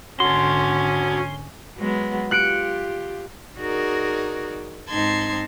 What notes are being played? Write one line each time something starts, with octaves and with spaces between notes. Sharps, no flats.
G#1 D3 C#4 F#4 A4 C6
F#3 G#3 B3
F4 G4 F#6 C#7 D7
D#4 F#4 G#4 A#4 D5
G#2 C4 D#4 A5 C6 G#6